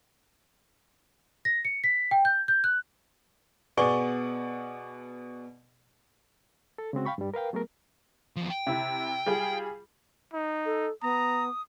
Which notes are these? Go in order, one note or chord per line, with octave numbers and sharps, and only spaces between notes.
A#6
C#7
B6
G5
G6
G6
F#6
B2 B3 G#4 D5 C#6 G7
A4
C#3 G#3 C4 F#4
F5 G5 B5 C#6
G2 G3
A#4 B4 F5 G5
F#3 A3 B3 G#4 A#4
E2 F3
G5
C3 E4
G3 F4 G#4
D#4
A4
B3 A#5 D#6